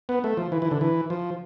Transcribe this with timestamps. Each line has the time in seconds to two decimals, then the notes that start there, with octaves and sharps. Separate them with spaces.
0.09 B3
0.24 A3
0.37 F3
0.52 E3
0.62 E3
0.71 D3
0.81 E3
1.10 F3